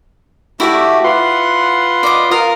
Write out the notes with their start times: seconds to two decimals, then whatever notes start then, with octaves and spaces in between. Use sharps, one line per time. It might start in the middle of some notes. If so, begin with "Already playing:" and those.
0.60 A3 E4 F#4 G4 D5 E5
1.04 F4 B4 F#5 C6
2.03 D5 D#5 D6
2.31 F4 A#4 F5 D#6